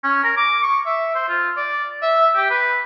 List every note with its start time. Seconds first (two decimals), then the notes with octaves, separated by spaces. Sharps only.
0.04 C#4
0.24 A#4
0.37 D6
0.63 C#6
0.86 E5
1.15 C5
1.28 F4
1.57 D5
2.02 E5
2.36 G4
2.50 B4